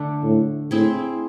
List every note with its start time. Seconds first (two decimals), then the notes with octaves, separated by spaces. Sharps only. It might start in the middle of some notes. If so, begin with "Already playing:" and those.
Already playing: D3 A3 D4
0.23 A2
0.71 A2 C4 E4 G#4